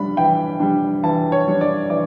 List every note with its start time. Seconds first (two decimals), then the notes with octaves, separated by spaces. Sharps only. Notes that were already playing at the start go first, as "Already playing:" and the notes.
Already playing: G3 D4 B5
0.17 E3 G5
0.60 G3 D4
1.03 E3 A5
1.32 C#5
1.47 G3 D4
1.61 D5
1.90 E3 D5